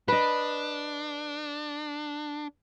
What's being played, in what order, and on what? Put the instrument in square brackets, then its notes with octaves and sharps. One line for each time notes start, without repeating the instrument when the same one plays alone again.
[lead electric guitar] D4 [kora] B4 D#5